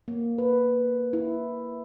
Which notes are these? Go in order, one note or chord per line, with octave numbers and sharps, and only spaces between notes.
A#3
B4
E4